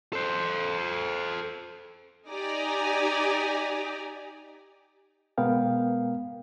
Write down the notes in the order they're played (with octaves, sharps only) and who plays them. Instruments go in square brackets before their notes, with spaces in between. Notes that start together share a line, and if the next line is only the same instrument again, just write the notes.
[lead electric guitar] A4 C5
[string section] D#4 G4 D5 G#5 A#5
[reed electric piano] B2 G#3 B3 A#4 F5 G5